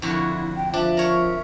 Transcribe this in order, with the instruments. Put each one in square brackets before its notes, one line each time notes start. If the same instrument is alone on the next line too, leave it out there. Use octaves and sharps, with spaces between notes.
[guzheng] F2 D3 F#4 [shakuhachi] E4
[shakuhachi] G5
[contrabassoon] F3 [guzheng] D4 [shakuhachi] E5
[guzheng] A#4 C#5